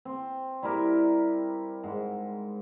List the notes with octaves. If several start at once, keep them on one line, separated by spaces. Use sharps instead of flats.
C4
G3 E4 G4 A#4
G#2